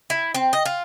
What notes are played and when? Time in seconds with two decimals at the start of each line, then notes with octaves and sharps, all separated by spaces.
0.10 E4
0.34 C4
0.53 D#5
0.66 F4